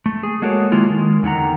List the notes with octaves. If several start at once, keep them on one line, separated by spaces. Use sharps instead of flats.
A3
G#4
G#3 A#3 F#4 A4 A#4 C#5
D#3 G#3 A#3 E4 F4
D#3 G#3
E2 D3 D#3 F#5 A#5